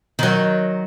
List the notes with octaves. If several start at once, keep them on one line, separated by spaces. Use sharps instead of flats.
D#3 F#3